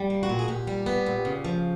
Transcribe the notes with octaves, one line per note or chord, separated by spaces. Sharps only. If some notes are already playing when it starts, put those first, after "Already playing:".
Already playing: G3
A#3
F#4
A#2
G#4
A#2 G4
G3
B3
A#2
C#3
F3